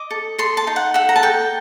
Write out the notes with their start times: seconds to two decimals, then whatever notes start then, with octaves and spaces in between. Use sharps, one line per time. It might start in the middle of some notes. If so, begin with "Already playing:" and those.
Already playing: D#5 D6
0.11 A4
0.38 A4 C6
0.57 A5
0.67 D#4
0.76 F#5
0.94 A4 F#5
1.09 A#5
1.16 A5
1.23 A4 G5